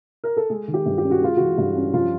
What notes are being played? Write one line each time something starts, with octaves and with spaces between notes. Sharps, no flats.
A#4
A4
G#3 G#4
D#3
G4
G2
G4
C#4
F#4
G#3 F4
E3 F#4
G2
C#4
F3 F4